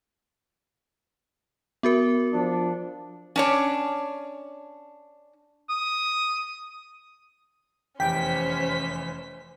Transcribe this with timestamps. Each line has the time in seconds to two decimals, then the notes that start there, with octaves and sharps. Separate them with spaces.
1.83 B3 F#4 A#4
2.33 F3 D4
3.36 C#4 D4 C#5
5.70 D#6
8.00 F1 E2 C#4 G4 C5 G5 B6